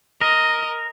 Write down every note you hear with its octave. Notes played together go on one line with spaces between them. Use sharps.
A#4 D#5